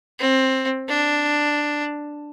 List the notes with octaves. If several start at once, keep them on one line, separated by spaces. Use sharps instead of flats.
C4
D4